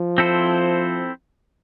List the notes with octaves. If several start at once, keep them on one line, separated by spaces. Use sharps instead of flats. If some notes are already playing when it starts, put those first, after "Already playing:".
Already playing: F3
C4 E4 A4 C5